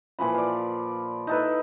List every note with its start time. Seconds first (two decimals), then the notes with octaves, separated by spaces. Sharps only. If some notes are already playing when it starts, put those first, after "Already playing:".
0.19 A#2 E3 F3 B5
0.34 D5 F5
1.27 D#4 E4 A4 B4